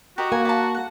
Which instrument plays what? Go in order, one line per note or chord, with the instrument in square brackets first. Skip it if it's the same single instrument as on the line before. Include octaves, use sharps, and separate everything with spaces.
[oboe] F#4 [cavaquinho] G4 A#4 D#5
[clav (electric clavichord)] A#3 [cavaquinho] G#5
[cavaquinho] D5 A5 [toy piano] F5 A#5
[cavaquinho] F#5